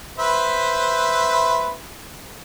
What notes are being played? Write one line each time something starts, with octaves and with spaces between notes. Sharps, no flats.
B4 C5 E5